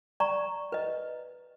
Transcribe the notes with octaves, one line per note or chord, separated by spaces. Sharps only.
D5 A#5 C#6
B4 D#5